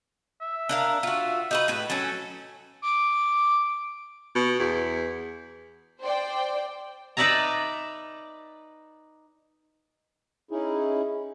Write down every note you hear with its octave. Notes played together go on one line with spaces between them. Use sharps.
E5
D4 A#4 F5
F4 F#4
D#4 F#4 B4
A2 B4
F#3 C#4 A4
D6
B2
E2
C5 D5 G5
D#4 B4 D5 E5 A5 A#5
C#4 D#4 E4 G#4